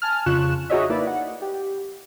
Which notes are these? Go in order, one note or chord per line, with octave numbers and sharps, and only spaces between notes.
G#5 A5 F6
F2 C#3 F4 C#6 F#6 E7
D#4 F#4 G#4 C#5 D#5 E5
A#3 D#4 E4 B4 D5
F#5
G4